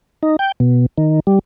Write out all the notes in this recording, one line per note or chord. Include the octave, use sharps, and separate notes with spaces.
D#4
G5
B2
D#3
G3